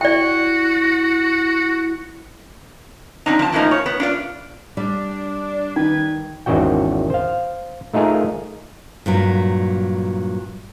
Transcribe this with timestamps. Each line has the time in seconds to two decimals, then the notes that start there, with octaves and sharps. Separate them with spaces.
0.01 E4 F#4 D5 G5
3.26 F3 C4 D4 D#4
3.39 F3 A5
3.53 A2 E3 F3 A#3 D#4
3.71 C#5
3.86 B3
4.00 D4 F4 D5
4.77 G3 D4 D5
5.76 D#3 B4 G#6
6.46 G#1 E2 D#3 C#4 F#4 G5
7.10 C5 F5
7.94 A3 D#4 F4 G#4 A#4
9.06 G2 A#2 F#3